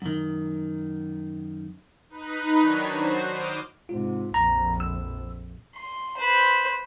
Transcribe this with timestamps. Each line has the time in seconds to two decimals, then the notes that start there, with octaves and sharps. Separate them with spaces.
0.02 F#2 D#3
2.09 D#4 B4
2.58 D#3 F#3 D4 C#5
2.92 F#4 C5
3.28 D6 D#6 F6 G6 D7 E7
3.89 G#2 C3 F4
4.34 A#1 F2 A#5
4.80 E6
5.75 C6
6.18 B4 C5